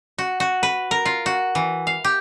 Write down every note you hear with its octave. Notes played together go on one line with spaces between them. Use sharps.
F#4
F#4
B4
A#4
F4
F#4
E3
F5
G4